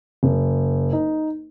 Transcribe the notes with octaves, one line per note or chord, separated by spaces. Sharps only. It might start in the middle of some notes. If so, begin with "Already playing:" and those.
F#1
D#4